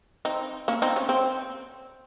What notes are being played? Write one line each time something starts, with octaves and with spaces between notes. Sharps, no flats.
C4 D#4
A#3 C#4
C4 D#4
C#4
C4